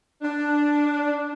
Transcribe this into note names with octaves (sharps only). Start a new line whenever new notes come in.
D4